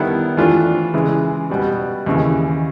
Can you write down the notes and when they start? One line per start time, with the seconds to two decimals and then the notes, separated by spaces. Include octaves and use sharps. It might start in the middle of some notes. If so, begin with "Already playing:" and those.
Already playing: D#3 G3 B3 E4 A4
0.37 E3 A3 D4 F4
0.94 C#3 E3 G#3
1.50 B2 G3 B3
2.06 D#2 C#3 E3